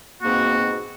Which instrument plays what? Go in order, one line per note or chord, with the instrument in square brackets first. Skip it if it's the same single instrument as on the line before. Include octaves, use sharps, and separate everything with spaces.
[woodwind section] G#2 B2 A#3 C4 F#4